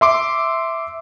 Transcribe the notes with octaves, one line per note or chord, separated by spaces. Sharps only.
E5 C6 D6